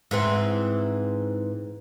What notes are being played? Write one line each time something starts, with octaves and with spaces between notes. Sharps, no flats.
G#2 E3 C4